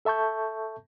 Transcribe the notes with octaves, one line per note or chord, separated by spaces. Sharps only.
A4 E5 A5 C#6 G6